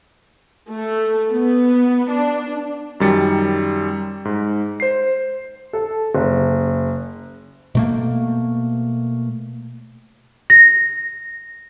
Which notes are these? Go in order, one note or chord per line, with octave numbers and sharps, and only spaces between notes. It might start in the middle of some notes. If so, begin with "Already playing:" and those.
A3
B3
D4
F#2 D#3 G3 A6 C#7
G#2
C5 C7
A4
F#1
B2 A3 A#3
A#6